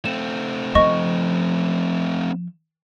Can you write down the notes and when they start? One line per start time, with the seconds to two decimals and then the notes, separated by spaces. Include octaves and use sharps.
0.05 A3 C4 E7
0.75 F3 C#4 D#5 C#6